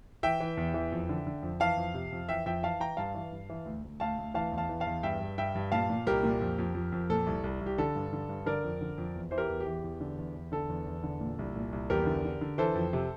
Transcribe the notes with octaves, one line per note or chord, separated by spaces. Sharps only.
E3 E5 G5
E3
E2
E3
F2
D3
D3
F2
E3 F5 A5
F2
C3
F2
E3 E5 G5
F2 E5 G5
E3 F5 A5
E3 G5 A#5
G2 F5 A5
E3
G2
E3
D2
D2
D2 F5 A5
D2
E3 F5 A5
E2
F5 A5
E3
F5 A5
E2
G2 E5 G5
G2
G2 E5 G5
G2
A#2 F5 A5
A#2
C2 G4 A#4
A#2
F2
F2
F2
F2
A#2 A4
C2
C2
C2
G4
D3 A4
G2
D3
G2
D3 A#4 D5
F2
D3
F2
E2
E3 C5
G4 A#4
E2
G4
E3
E2
D3
E2
E2
D3 A4
E2
E2
D3
A#2
C2
A#2
C2
E2 G4 A#4
D3
D3
D3
E3 A4 C5
F2
C3